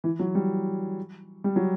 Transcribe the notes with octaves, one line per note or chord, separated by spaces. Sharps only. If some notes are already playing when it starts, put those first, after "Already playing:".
E3
F#3
G3
G3
F#3